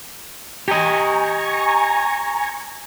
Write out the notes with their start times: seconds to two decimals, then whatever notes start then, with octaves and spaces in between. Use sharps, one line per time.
0.68 G4 D#5 G#5 A#5 C#6